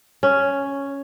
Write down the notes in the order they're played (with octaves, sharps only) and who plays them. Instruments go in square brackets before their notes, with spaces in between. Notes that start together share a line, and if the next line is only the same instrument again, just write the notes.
[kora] C#4